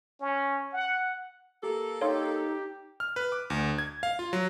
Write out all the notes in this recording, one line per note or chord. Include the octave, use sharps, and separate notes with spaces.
C#4
F#5
A#3 G4 A4
D#4 G4 C#5 F5 C6
F6
B4
D6
D2
G#6
F5
F4
F#3